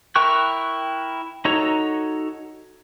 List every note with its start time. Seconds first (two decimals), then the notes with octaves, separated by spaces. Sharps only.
0.15 E4 A#4 G5 C#6 F#6
1.45 D#4 F#4 A4 C#5 A#5